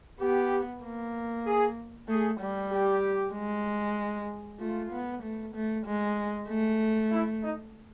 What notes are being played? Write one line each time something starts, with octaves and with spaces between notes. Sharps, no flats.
B3 G4
A#3
G#4
A3 G#4
G3
G4
G#3
A3 F4
B3
A3
A3
G#3
A3
E4
D#4